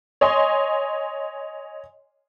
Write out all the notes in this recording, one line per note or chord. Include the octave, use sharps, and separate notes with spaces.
C#5 D#5 G#5 C6